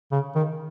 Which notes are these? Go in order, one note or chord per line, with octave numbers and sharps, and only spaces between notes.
C#3
D#3